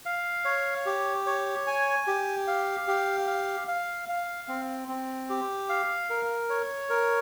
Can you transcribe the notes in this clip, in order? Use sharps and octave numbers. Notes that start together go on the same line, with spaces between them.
F5
C#5
G4
C#5
G#5
G4
F5
G4
F5
F5
F5
C4
C4
G4
F5
A#4
C#5
A#4